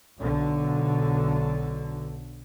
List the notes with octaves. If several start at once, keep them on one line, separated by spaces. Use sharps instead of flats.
B1 D3